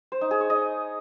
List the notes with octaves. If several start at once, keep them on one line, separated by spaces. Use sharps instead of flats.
C5
D#4
G#4
C#5
D#5